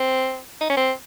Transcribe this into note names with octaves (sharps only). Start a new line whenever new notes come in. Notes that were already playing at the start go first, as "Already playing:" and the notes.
Already playing: C4
D#4
C#4
C4